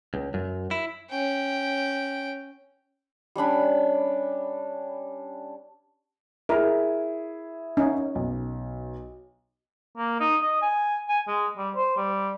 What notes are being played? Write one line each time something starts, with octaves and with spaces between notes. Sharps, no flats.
C#2
F#2
E4
C#4 G5
G3 C#4 D4 B5
E4 G#4 A#4
C#4 D#4
B1
A#3
D#4
D#5
G#5
G#5
G#3
G3
C5
G3